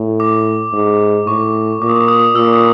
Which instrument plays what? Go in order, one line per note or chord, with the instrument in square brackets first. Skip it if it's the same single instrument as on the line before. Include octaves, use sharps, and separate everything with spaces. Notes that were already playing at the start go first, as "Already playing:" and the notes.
Already playing: [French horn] A2
[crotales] D6
[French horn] G#2
[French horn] A2 [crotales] C#6
[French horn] A#2 [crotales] D6
[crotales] D#6
D6
D#6
[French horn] A#2 [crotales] E6
[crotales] D#6